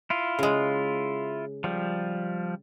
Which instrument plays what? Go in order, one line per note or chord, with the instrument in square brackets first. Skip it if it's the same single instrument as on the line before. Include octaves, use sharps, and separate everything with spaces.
[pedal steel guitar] E4 F4
[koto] C#3 G#3
[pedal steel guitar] F3 G3